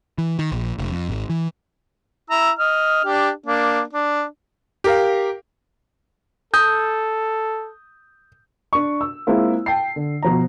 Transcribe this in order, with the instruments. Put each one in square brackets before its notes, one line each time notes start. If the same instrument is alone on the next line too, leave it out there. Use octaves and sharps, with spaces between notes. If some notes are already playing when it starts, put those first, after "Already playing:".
[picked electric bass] E3
D#3
A#1
F1
F2
G#1
E3
[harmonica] E4 A#5 E6
D#5 F6
D4 G4
A#3 D4
D4
[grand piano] G4 A#4 F5
[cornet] A4 [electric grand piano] D#6 G6
[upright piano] D4 C#6
E6
G#3 A#3 C4 E4 F4
G5 A5 C7
D3
B2 F3 A#5